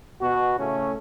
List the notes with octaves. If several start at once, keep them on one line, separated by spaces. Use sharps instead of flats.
B2 F#4
A2 C#3 A3 C#4